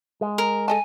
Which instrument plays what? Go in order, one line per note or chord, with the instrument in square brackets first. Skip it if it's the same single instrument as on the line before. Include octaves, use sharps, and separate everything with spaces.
[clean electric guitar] G#3
[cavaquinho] A#4
[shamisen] A4 D#5 A5 [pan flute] G#5